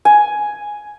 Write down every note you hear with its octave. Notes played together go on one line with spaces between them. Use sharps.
G#5